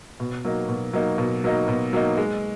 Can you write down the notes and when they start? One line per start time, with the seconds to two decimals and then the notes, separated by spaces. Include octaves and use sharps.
0.20 B2
0.45 F#3 A#3 D#4
0.69 B2
0.93 F#3 A#3 D#4
1.18 B2
1.44 F#3 A#3 D#4
1.68 B2
1.93 F#3 A#3 D#4
2.17 G#3